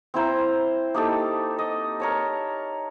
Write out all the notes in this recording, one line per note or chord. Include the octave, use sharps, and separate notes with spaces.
C4 E4 C5 A#5
A#3 D#4 G4 A4
D#5
A#4 C#5 A5